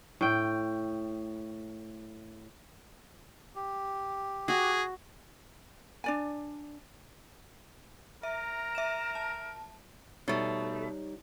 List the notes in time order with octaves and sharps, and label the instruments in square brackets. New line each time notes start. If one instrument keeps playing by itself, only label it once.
[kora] A2 G5
[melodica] G4
[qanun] F#4 [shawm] G#4
[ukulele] D4 D5 G#5
[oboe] A#4 [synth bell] E5 [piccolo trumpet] A#5
[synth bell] E5 E7
A5
[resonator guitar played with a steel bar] B2 A3 [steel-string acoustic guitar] G3 D#4 C#5